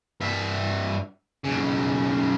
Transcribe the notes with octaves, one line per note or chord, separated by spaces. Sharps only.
G2 E5
B1 C#3